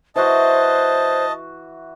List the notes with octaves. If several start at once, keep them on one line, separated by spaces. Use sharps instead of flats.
E3 F#4 C5 D#5 A5